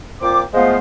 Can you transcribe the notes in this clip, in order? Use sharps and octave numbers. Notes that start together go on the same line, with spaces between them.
A#2 C4 F4 G5 D6
F3 G#3 A3 B3 C5 F5